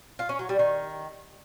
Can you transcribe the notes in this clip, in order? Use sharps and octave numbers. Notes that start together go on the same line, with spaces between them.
F4
C#4
F#3
G3
D#3